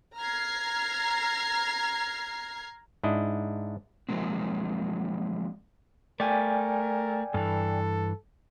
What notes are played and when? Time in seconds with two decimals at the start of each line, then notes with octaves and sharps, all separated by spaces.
0.17 A#5 F6 G#6 C7
3.03 G#2 D4 E4 D#5
4.09 F3 F#3 G#3 A#3 C4
6.20 A3 A#4 D5 G5 G#5
7.34 G2 E3 A4